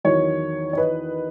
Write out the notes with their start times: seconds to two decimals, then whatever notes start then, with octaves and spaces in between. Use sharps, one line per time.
0.04 E2 D#3 F#3 C#5
0.73 C#5
0.78 B4 D#5